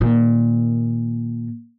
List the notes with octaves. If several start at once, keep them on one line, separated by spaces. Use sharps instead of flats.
A#2 D#3